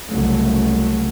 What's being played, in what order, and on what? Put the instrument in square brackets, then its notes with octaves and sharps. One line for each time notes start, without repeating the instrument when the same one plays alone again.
[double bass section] C2 A#2 C#3 F#3 A3